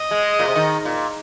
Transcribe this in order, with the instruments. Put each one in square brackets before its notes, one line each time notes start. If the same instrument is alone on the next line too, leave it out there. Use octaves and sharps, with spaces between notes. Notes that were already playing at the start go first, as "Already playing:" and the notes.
Already playing: [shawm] D#5
[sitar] G#3
A#2
C3
D#3
A#2